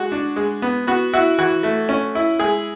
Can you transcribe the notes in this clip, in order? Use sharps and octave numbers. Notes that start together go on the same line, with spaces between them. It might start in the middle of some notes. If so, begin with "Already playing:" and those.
Already playing: G#3 F#4
D4
G#3
B3
B3 F#4
E4 F#4
E3 F#4
A3
C#4
E4
G#3 G#4